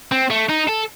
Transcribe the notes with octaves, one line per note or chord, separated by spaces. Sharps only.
C4
A3
D#4
A4